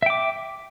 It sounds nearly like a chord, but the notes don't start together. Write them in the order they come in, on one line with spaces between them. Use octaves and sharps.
E5 G5 D6